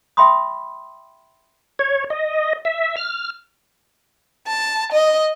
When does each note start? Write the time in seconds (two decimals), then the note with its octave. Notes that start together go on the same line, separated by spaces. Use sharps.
0.17 E5 G5 B5 C6 D#6
1.79 C#5
2.10 D#5
2.65 E5
2.97 F6
4.47 A5
4.92 D#5